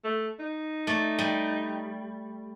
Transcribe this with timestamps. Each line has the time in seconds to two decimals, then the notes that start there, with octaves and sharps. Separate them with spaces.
0.04 A3
0.40 D#4
0.87 A3 D5
1.19 G3